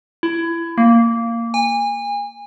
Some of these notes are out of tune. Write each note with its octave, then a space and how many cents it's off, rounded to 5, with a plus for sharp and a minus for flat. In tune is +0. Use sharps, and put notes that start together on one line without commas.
E4 +25
A#3 -10
G#5 -30